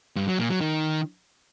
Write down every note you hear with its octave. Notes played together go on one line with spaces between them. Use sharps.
G2
F#3
A#2
F#3
D#3